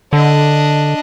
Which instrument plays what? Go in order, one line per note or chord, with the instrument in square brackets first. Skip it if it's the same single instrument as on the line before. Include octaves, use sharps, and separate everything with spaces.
[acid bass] D3 [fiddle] D4 D#5